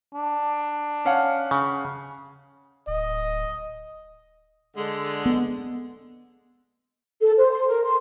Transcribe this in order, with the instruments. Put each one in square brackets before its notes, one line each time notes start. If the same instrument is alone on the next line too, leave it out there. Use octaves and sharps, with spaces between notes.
[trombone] D4
[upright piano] C#4 F5 F#5
[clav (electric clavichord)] C#3
[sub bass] D1 [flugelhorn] D#5
[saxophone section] D3 G#3
[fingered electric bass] B3
[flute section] A4
C5
C6
A#4
C6